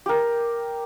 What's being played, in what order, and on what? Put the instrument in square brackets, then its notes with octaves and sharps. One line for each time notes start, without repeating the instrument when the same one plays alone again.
[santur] G4 A#4